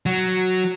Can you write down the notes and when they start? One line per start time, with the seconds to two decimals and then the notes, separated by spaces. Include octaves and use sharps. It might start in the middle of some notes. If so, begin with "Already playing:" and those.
0.06 F#3